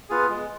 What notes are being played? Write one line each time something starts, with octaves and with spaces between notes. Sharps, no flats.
B3 F4 G#4
G#3